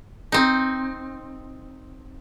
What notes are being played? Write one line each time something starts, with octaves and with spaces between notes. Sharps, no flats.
C4 D#4